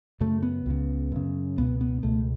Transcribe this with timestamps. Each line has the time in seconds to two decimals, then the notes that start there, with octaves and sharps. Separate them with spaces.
0.20 F#2 C#3 A3
0.43 B3
0.66 C#2 C#3
1.12 F#2 C#3
1.58 C#2 B2 B3
1.81 B3
2.03 C#2 B2 A3